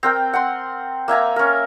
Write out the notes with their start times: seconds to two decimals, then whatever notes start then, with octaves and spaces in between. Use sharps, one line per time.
0.03 C4 A#4 G5
0.33 F#5 C6
1.08 A#3 E5 G#5 A#5
1.36 C#4 A#4